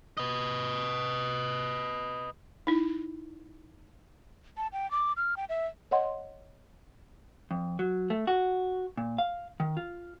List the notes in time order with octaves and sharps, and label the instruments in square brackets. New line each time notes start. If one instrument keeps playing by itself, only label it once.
[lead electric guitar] B4 D#5
[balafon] D#4 E4
[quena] A5
G5
D6
F6
G5
E5
[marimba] C#5 D#5 F#5 C6
[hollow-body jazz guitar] F2
F#3
A3
F#4
A#2
F5
D#3
F4